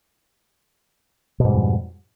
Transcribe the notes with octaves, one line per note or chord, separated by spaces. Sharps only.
F2 G#2 B2 G3